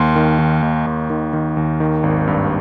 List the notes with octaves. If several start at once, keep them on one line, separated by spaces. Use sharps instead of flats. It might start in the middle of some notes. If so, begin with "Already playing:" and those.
Already playing: D#2 C6
D#3
D#3
D#2
D#2
D#3
D#3
D#2
D#3
G#1
G2